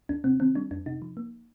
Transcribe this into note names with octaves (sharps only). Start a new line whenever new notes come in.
D#2 D4
C3 C4
D#3 C4
G3 D4
F2 D4
C3 D#4
F3
A#3